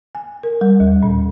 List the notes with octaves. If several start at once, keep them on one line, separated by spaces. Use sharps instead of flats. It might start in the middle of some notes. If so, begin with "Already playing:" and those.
G#5
A#4
G3
D#2
A#2